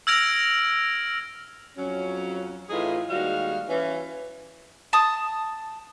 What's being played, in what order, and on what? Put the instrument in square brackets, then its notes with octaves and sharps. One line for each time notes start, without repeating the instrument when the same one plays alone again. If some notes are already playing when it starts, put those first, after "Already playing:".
[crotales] E6 F6 G#6 A#6 D7 F7
[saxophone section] F2 F#3 C#4
A2 E3 D#4 F4 G#4
D#2 G3 G#3 F#4 F5
E3 C#4
[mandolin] A5 D#6